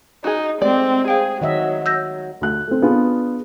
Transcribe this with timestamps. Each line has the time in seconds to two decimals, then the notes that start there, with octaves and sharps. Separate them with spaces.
0.24 D#4 F#4 G#4
0.62 G#3 A3 C4 G4 D5
1.08 G#4 C5 F5 G5
1.41 D#3 F#3 D#5 E5
1.86 F#3 E6 G6 A#6
2.41 D2 F#6
2.67 A3 C4
2.82 B3 D4 F4 G#4